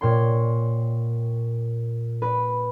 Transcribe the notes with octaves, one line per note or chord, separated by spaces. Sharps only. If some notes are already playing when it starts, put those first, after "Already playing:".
A#2 C#5 G5 C6
B4